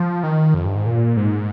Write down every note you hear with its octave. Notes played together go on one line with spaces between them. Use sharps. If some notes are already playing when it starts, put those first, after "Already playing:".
Already playing: F3
D#3
F2
G2
G#2
A#2
G#2